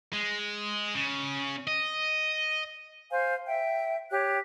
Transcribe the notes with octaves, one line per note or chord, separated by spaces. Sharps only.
G#3
C#3
D#5
C5 F5 G#5
E5 G5
G4 C#5 F#6